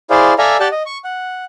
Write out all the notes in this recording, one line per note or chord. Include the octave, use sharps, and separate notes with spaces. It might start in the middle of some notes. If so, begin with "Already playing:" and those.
E4 G#4 C5 D5 F5
A4 D5 E5 F5 G#5 A#5
G4 D5 F#5 G5 A5
D#5
C#6
F#5